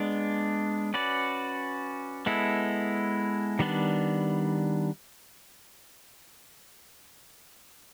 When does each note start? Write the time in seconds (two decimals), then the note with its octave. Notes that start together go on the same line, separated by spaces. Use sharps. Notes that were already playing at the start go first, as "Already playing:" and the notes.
Already playing: G#3 B3 D4
0.94 C#4 F#4 B4 D5
2.26 G#3 B3 E4 A4
3.59 D#3 G3 B3 D4